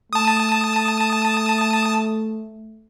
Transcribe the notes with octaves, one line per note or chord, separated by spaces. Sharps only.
A3 A5 D#6